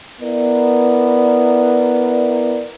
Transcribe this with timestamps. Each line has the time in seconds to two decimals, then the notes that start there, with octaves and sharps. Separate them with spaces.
0.21 B3 E4 A#4 D5